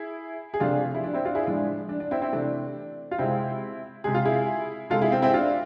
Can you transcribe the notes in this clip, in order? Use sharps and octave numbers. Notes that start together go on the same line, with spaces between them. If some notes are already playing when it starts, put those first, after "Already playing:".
Already playing: E4 G#4
G#4
C3 F3 A3 D4 F4
E4
D4
C4 E4
D4 F4
E4 G#4
A2 F3 G#3 D4
D4
D4
C4 E4
C4 E4
C3 E3 A3 D4
F4
C3 G#3 C4 E4
C3 G#3 G#4
F4
E4 G#4
C3 G#3 F4 A4
E4 G#4
C4
C4 E4
D4 F4